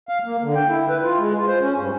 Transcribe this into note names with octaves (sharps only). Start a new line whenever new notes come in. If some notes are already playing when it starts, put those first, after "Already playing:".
F5
A#3
D3
G5
E4
B4
F4
G#3
F4
C5
C#4
G2